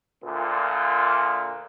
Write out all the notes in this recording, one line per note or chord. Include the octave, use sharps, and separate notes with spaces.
D2 A#2